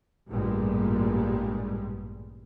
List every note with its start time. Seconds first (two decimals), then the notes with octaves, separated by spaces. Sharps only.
0.30 A1 G2 A#2 G3 G#3